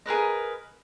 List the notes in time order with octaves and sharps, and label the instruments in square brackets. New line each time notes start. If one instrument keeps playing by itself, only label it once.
[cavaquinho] G#4 A#4 B4 D#5